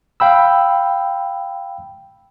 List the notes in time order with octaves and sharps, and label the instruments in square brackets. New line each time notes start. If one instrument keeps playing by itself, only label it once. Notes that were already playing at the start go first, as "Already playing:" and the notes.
[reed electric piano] F5 G5 B5 E6